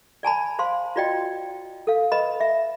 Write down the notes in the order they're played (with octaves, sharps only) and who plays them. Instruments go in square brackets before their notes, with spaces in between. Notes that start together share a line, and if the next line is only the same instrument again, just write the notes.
[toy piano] D5 G#5 A5 B5
C5 F5 C6
F4 F#4 D5 D#5 G5
A4 F5
B4 D#5 B5
E5